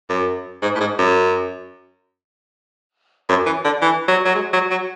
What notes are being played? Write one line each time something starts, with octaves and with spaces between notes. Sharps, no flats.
F#2
G#2
A2
G#2
F#2
F#2
E3
D3
E3
F#3
F#3
G#3
F#3
F#3